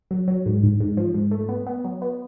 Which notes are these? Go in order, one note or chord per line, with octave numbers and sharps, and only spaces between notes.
F#3
F#3
G#2
G#2
G#2
F3
G#2
A3
B3
B3
F#3
B3